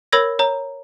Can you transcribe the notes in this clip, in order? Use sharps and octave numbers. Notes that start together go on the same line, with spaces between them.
A#4 C#5 B5 E6 G#6 A#6
C#5 A#5